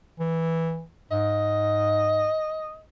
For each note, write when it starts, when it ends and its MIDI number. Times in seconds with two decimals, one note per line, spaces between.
0.19 0.83 52
1.11 2.31 44
1.11 2.81 75